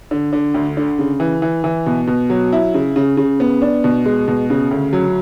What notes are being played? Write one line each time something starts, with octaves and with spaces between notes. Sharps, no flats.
D3
D3
D2
D3
C#3
E3
E3
E3
B2
B2
F#3
E4
C#3
C#3
C#3
B3
D4
B2
G#3
B2
C#3
D2
F#3